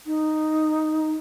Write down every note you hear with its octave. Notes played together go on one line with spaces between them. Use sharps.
D#4